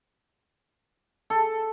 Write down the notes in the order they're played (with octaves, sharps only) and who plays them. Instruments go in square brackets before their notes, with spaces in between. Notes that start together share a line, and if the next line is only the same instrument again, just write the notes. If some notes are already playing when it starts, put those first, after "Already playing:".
[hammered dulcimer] A4